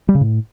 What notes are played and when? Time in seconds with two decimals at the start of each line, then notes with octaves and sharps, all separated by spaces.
0.09 G3
0.15 C#3
0.21 A2